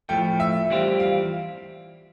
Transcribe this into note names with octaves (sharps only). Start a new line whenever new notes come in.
A2 F3 A3 G5
E5
E3 G3 C4 F4
F5